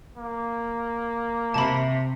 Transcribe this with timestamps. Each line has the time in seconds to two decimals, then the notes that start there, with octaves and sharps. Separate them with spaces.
0.18 A#3
1.54 C3 A5 B5